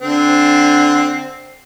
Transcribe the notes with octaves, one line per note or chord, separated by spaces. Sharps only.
D3 C4